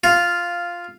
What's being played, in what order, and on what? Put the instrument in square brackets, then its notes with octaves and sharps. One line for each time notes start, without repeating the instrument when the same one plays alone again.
[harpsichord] F4